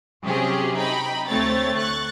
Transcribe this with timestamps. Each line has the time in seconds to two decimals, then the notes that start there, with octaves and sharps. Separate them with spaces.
0.24 C3 F#3 C#4 G4 G#4
0.77 D#4 G5 B5
1.29 D2 A3 C4 C#5 A6
1.78 C#6 F#6 A6